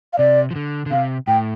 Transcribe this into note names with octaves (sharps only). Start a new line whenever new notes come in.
F5
C3 D5
F3
D3
D3
C3 F5
A2 G5